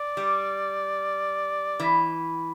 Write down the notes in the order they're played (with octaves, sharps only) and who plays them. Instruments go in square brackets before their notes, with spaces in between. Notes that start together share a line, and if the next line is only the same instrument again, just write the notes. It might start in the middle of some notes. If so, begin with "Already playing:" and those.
Already playing: [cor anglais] D5
[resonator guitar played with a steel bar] G3
E3